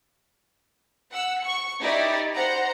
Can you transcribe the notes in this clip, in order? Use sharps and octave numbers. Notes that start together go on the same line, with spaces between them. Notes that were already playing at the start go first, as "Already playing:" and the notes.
F#5 E6
C#6 C#7
D#4 E4 G4 D5
C5 F#5 A#5